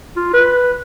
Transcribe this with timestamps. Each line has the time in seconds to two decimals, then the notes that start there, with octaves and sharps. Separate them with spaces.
0.16 F4
0.33 B4